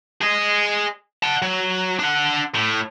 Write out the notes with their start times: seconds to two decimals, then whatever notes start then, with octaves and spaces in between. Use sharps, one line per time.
0.22 G#4 D#5
1.23 F#5 A5
1.42 F#3
1.99 D4 F#5
2.55 A2